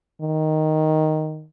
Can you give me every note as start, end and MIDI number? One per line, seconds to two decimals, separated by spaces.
0.22 1.46 51